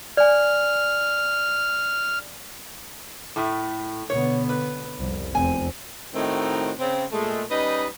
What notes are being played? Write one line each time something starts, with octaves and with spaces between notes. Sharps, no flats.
D5 G#5 F6
A2 A3
B2 D3 B3 C#5
B4
C2 F2
F1 E2 C4 G#5
A2 D#3 A3 C4 D#4 F#4
C#3 C4
A#2 G#3 A3
G3 C#4 D#4 B4 D#5